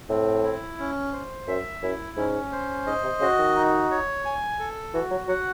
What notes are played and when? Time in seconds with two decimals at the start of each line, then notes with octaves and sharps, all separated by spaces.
0.10 A2 C4
0.44 E4
0.79 C#4
1.13 C5
1.48 F#2 E5
1.83 F#2 E4
2.17 G#2 C#4
2.52 C5
2.87 G#2 D#5
3.03 C3
3.21 C#3 F#4
3.38 D#3
3.56 D#4
3.91 C#5
4.25 G#5
4.59 A4
4.94 E3 F#4
5.11 F#3
5.28 F#3 F#5